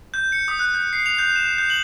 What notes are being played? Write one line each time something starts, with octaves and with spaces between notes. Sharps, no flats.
G6
C#7
D#6
F#6
G6
C7
F7
G6
E7
G6
F#7